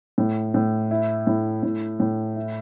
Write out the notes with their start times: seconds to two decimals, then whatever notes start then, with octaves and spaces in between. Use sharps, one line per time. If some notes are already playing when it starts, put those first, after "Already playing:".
0.18 A2
0.54 A2
0.91 E4
1.27 A2
1.63 A2
2.00 A2
2.36 E4